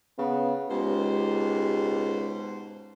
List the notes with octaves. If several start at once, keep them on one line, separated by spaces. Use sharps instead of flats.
C#3 B3
C#2 G#2 B2 G4 C5